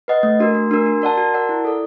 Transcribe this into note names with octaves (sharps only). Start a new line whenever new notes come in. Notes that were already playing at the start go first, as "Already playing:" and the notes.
B4 D#5 F#5
A3
D4 F#4 A#4
A3
D4 F#4 A#4
F#4
A#4 D5 F#5 A5
F#4
A#4 D5 F#5 A5
E4
A4 D5